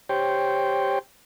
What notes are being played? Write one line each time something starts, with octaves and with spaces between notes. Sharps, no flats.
G4 C5 C#5 G5